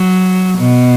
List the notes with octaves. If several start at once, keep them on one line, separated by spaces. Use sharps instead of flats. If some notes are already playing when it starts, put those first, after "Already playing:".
Already playing: F#3
B2